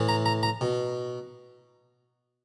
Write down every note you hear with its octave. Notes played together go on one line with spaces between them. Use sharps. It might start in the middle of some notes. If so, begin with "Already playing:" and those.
Already playing: A2 E3
A#5
A#5
A#5
B2